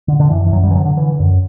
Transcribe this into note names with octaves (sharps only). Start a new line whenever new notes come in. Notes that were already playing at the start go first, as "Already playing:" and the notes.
D3
D3
F#2 E3
E3
F#2 F#3
G3
E3
D3 F#3
D3
D3 E3
F#2